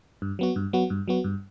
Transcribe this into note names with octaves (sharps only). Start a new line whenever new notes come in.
G2
F#3 B3 F#4
G2
F#3 B3 F#4
G2
F#3 B3 F#4
G2